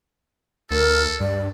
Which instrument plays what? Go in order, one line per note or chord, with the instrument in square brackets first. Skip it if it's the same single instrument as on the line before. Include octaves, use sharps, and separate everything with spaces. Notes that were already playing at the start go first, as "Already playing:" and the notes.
[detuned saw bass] D2 [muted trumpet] A4 [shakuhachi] A#4
[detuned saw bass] G2 [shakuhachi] D5